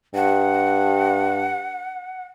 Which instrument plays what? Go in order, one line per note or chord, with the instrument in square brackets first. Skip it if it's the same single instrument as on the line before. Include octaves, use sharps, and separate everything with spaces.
[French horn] G2 [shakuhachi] F#5